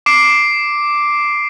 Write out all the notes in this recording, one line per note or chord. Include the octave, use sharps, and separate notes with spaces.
D6 C7 D7